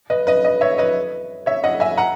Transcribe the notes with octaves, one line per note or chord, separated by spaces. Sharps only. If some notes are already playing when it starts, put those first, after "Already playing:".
B4 D#5
B4 D#5
B4 D#5
C#5 E5
B4 D#5
C#5 E5
D#5 F#5
E5 G#5
F#5 A#5